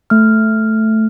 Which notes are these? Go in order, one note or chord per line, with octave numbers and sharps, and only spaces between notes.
A3 F6